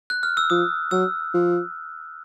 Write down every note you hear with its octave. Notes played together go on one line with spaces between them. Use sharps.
F#6
F6
E6
F3 D#6
F#3 E6
F3